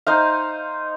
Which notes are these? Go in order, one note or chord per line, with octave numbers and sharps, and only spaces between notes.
D#4 C5 F5